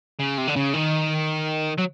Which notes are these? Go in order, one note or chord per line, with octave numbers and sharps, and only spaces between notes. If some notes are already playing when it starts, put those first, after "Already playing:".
C#3
C3
D3
C#3
D#3
F#3